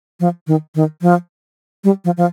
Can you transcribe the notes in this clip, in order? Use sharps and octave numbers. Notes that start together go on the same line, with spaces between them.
F3
D#3
D#3
F3
G3
F3
F3